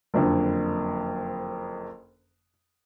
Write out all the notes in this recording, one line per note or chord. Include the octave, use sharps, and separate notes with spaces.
F#1 F2 D3